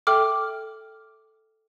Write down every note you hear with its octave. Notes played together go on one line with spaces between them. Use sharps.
A4 E5 G5 D6 F6